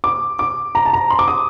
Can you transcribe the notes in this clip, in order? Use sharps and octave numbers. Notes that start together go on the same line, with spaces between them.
D6
D6
A#5
A5
A#5
C6
D6
D#6